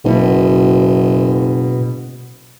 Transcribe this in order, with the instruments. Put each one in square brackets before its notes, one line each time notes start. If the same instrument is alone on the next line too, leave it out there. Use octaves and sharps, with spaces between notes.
[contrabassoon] F#1 [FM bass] B2